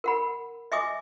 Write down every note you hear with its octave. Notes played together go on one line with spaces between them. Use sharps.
A#4 F#5 B5
D#5 E5 G#5 D6 D#6